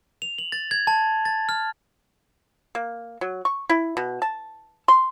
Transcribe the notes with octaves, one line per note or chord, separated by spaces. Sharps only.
F7
F#7
A6
G#6
A5
A6
F6
A#3
F#3
C#6
E4
B2
A5
C6